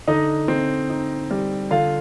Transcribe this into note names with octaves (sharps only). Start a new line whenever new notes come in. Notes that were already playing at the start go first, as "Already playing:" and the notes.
D3 D#4 D#5
C4
D#4
G3
D3 F4 F5